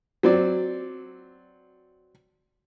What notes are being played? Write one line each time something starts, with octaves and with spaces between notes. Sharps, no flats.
F#3 C4 D5